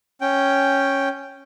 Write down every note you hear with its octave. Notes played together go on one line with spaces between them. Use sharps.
C#4 G5